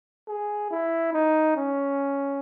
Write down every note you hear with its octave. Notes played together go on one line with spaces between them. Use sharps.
G#4
E4
D#4
C#4